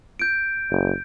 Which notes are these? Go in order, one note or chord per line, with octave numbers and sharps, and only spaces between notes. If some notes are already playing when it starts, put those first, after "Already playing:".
G6 D7
F#1